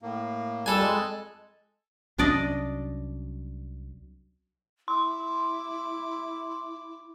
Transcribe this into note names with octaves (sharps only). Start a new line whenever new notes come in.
A2 A#3
F2 G3 A4 G#5 A5 F#6
G#3
C2 F#3 C#4 D4 D5 D#5
E4 C6 D6